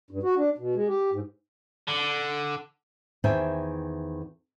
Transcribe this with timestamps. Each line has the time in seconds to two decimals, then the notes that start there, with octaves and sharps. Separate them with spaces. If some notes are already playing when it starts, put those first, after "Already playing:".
0.11 G2
0.23 F#4
0.37 D4
0.58 B2
0.75 G#3
0.88 G4
1.12 G#2
1.88 D3
3.24 E2 D#3 C5 E5 G5 G#5